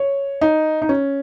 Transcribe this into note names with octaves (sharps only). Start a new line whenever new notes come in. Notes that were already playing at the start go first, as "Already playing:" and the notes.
Already playing: C#5
D#4
D#4
C#4